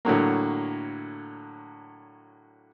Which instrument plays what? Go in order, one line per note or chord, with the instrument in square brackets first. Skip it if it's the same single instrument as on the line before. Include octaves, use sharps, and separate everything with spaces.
[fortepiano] A2 D3 F#3 A#3